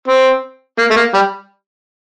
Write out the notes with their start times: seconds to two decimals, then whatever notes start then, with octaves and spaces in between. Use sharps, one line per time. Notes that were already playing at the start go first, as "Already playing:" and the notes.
0.08 C4
0.79 A#3
0.91 A3
0.96 A#3
1.14 G3